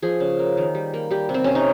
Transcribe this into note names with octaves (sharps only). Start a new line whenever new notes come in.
F3 G#4
C#3
A#3
D#3
G3
A#3
G3 G4
C3
C4
C3 C#4
D#4